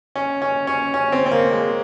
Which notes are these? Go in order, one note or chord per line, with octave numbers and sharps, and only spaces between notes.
C#4
C#4
C#4
C#4
C4
C4
A#3
G#3